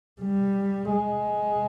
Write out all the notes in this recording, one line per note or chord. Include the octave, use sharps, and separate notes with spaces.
G3
G#3